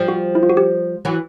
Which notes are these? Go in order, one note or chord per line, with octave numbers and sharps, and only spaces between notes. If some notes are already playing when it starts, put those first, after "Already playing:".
Already playing: F3 G3
F#4
E4
F4
F#4
G4
E3 F#3